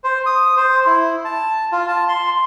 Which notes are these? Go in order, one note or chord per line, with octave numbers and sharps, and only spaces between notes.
C5
D#6
C5
E4
A5
F4
A5
C6